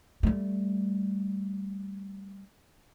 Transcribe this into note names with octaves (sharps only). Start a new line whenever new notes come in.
G3 A3